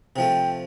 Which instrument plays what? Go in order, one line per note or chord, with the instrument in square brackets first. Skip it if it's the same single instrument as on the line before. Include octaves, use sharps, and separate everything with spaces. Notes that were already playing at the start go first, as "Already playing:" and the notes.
[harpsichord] C3 F3 A3 [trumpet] G5